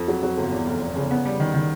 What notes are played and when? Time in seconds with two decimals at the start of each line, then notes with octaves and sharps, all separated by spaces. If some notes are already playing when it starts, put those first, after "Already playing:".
Already playing: F2
0.08 F#3
0.23 F#3
0.37 G1
0.52 E2
0.67 F1
0.81 F1
0.96 C#3
1.11 B3
1.25 G3
1.40 D#3
1.54 D#3